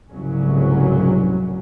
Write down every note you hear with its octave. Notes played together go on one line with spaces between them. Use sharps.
F1 C2 G#2 C#3 F#3 C#4